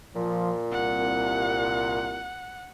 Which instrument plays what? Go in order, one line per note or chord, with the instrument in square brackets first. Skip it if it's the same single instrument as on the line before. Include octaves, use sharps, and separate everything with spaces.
[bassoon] A#2 [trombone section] F3
[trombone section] C2 [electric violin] F#5